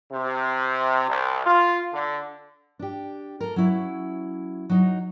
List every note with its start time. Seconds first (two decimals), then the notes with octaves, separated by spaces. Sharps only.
0.12 C3
1.09 C2
1.46 F4
1.93 D3
2.79 D4 G4
3.41 A4 A#4
3.56 F#3 C#4 E4
4.70 F#3 D#4